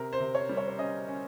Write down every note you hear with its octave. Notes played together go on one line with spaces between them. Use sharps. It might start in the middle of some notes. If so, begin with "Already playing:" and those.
Already playing: C3 A#4
C5
C3
C#5
G3
C#5
C#5
C#4 D#5
C#4